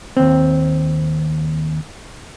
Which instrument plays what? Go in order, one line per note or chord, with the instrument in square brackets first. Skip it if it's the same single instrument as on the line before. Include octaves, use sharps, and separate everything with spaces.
[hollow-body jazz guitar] D#2 C4